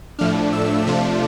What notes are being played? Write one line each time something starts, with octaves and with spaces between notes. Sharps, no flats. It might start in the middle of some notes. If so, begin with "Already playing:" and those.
A2 F3 A3 D4 F6
E6
C3 F3 A3 D4 F4